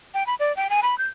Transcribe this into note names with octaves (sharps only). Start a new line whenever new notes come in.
G5
B5
D5
G5
G#5
B5
G6